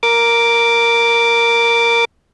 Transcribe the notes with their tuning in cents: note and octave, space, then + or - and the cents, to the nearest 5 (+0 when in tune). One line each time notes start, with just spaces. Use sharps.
A#4 +0 D6 +0